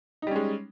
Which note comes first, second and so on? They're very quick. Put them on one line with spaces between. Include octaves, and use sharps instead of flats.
D#4 G3 C#4 G#3